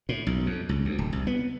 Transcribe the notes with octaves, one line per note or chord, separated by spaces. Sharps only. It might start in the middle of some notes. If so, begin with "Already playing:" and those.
A2
B1
F2
C#2
D2
D1
C2
B3